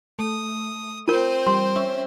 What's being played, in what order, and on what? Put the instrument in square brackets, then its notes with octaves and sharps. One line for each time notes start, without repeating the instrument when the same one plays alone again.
[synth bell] A3 [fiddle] D#6
[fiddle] C4 C5 [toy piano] F4 A#4 [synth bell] G6 D#7
[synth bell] G3 [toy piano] C6
[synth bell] C#4 E5